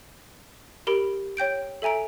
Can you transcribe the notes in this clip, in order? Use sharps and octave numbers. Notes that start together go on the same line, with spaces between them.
G4 A#4 B5 D7
C#5 G5 G6 D7
A4 E5 G#5 A#5 D7